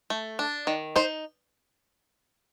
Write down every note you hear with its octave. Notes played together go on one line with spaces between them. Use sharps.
A3
D4
D#3
D#4 C5